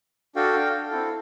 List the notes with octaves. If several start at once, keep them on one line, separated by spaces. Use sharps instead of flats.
D4 F#4 A4 F5 G5
C4 E4 A4